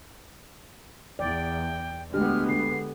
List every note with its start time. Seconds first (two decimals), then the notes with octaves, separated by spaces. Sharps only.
1.19 E2 D5 G5
2.14 D2 G#3 B3 G4 F6
2.49 D3 C7